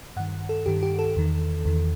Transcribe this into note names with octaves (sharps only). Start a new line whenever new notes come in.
G2 D#3 F#5
A4
G2 D#3 G4
G4
A4
E2 D#3
E2 D#3